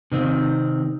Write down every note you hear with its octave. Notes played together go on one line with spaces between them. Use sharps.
C3 D#3 C4